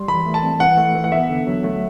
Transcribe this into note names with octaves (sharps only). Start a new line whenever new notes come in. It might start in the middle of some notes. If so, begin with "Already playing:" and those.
Already playing: G3 C6
E3 B5
A3
A5
C4
E3 F#5
A3
E3
F#5
B3 E5
D3
F#3
A3